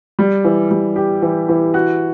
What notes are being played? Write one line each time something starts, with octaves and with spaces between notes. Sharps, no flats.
G3
E3
G3
G4
E3
E3
F#4